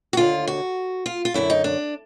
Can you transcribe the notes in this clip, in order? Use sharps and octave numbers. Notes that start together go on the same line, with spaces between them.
F#4
D#2 D3 F4
F#4
F4
F4
F#2 D3 E4
D#4
D4